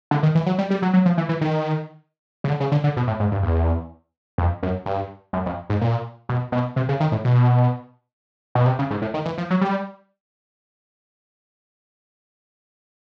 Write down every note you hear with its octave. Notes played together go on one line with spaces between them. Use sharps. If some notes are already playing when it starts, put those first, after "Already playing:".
D3
D#3
E3
F#3
G3
G3
F#3
F#3
F3
E3
E3
D#3
C#3
D3
C#3
D3
D3
B2
A2
G#2
G2
E2
F2
F#2
G2
F#2
F2
G#2
A#2
B2
B2
C3
C#3
D#3
A2
B2
B2
C3
C#3
G#2
A2
D#3
E3
F3
F#3
G3